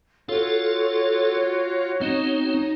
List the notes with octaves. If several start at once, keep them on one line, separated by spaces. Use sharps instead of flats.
F4 F#4 A4 C#5
C4 D#4